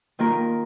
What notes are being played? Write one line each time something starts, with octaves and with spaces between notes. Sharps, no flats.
D#3 A#3 F4 A#4